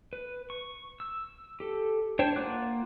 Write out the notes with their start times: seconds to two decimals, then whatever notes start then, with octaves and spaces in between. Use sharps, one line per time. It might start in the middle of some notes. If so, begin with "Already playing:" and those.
0.13 B4
0.50 C#6
1.00 E6
1.60 G4 A4
2.19 D4 C5 C#5 G5
2.36 A#3 F4 F#5 D6 F#6